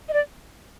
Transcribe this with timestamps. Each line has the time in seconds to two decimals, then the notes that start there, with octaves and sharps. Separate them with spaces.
0.09 D#5
0.13 D5